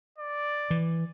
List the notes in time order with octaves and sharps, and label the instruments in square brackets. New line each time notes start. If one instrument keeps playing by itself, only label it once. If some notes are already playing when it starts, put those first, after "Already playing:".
[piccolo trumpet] D5
[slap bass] E3